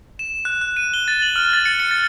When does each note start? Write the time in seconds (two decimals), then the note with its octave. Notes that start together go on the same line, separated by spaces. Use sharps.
0.19 E7
0.45 F#6
0.61 F#6
0.77 D#7
0.94 G7
1.08 A6
1.22 F#7
1.36 F6
1.53 A6
1.66 C#7
1.80 C#7
1.91 A6